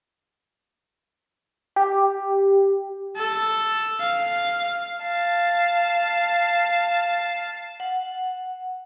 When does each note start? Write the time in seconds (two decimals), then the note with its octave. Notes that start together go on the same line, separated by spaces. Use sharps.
1.76 G4
3.16 A4
4.00 F5
5.02 F5 A5
7.80 F#5